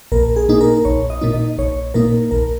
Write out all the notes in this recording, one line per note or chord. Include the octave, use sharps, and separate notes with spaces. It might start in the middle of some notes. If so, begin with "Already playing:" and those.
A#1 A#4
G#4
A#2 A#3 D#4
A#4
A#1 C#5
D#5
A#2 A#3 D#4
D#5
A#1 C#5
A#2 A#3 D#4 A#4
A#1 A#4